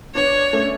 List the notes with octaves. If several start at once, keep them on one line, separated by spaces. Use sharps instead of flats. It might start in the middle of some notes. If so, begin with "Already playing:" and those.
B3 D4 C#5
A3 C#4